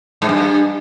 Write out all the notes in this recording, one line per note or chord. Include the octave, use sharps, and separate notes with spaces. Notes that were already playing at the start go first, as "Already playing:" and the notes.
G#2
G2